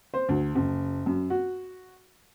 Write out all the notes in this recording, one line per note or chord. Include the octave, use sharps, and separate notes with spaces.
C5
D2
F#1
F#2
F#4